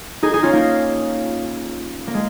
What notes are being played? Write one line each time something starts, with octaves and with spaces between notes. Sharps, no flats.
D#4 G#4
D#4 G#4
C#4 F4
A#3 D#4
A#3
G#3